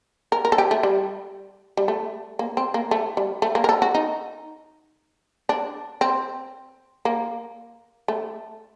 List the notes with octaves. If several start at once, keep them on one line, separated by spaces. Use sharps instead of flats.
A#4
A#4
A4
G4
A3
G3
G3
A3
A#3
C4
A#3
A3
G3
A3
A#3
A#4
A4
F#4
D#4
D4
C4
A#3
A3